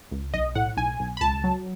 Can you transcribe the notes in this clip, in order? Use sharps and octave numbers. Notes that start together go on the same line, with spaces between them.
C#2
B1 D#5
A2 F#5
B1 G#5
B1
B5
C#2 A5
F#3